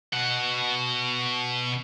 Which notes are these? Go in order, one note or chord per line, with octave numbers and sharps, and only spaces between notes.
B2 F#5